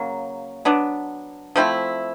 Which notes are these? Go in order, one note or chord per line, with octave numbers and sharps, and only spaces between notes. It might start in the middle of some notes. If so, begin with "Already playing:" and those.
Already playing: C#3 F#3 A#3
F#3 B3 D4
F3 A3 C4 E4